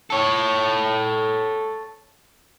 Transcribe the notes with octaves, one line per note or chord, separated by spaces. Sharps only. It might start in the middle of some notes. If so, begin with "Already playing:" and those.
A4 C#5